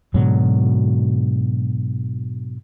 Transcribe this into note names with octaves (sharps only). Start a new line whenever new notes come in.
G#2 B2 D3 F#3